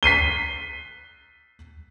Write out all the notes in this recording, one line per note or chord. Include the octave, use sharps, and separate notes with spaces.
B6 C7 D#7 G7